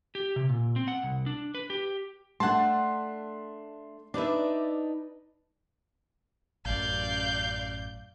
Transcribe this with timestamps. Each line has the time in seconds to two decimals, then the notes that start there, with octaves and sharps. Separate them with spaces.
0.15 G4
0.36 C3
0.49 A#2
0.76 C4
0.88 F#5
1.03 C2
1.26 D4
1.55 B4
1.70 G4
2.40 A3 D4 F#5 A5 C6
4.14 D4 D#4 B4 D5 E5
6.65 A1 F#2 D5 F5 G6